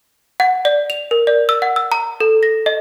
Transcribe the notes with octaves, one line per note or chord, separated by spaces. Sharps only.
F#5
D5
F7
A#4
D5
E6
F#5
E6
A#5
A4
A#6
D#5